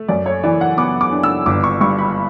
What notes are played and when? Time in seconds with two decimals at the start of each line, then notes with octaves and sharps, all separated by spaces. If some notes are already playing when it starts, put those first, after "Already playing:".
Already playing: A3
0.08 F#2 D5
0.26 C#5
0.43 E3 D5
0.61 F#5
0.77 B3 D6
1.01 D6
1.12 D4
1.23 E6
1.46 G1 D6
1.64 C#6
1.81 G2 C#6
1.98 B5